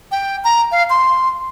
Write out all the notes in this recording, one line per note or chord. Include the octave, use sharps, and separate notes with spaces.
G5
A#5
F5
C6